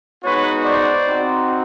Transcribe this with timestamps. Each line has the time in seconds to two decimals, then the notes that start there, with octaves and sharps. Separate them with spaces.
0.24 G#3 B3 D#4 F#4 B4 C#5
0.65 C5 D5
1.06 C4 D#4 F#4